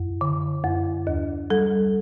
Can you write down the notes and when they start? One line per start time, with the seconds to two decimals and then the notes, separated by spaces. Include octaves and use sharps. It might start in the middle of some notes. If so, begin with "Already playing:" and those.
Already playing: F#2
0.21 D3
0.64 F#2
1.07 D#2
1.50 G3 A4